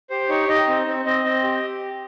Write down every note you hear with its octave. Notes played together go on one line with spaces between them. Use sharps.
G4 C5
D#4 C#5
D#4 D#5
C4
C4
C4 D#5
C4
G4